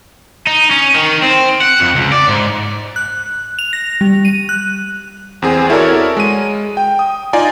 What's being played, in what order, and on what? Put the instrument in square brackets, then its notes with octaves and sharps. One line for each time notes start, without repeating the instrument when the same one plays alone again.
[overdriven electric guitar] D#4
C#4
D#3
C4
F#5
F2
C#2
D5
G#2
[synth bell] F#6
F7
A#6
G3
D#7
F#6
[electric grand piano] E2 C4 G#4
E4 F#4 A4 A#4 C#5 D5
G#3 D#7
G5
D#6
D#4 F4 D5 G#5 A#5